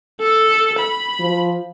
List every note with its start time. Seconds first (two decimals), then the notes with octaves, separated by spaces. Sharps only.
0.20 A4
0.79 B5
1.20 F3